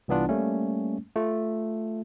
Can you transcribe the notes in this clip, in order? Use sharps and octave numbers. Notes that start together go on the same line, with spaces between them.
C2 E3 B3 D4 F4
G3 A3 A#3 C#4
A3 F4